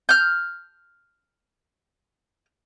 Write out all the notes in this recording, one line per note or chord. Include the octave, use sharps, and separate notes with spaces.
F6 G6